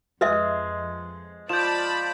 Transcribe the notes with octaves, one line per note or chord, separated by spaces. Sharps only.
F2 G#3 B4 D#5 E5
F3 D5 A5 B5 G6 E7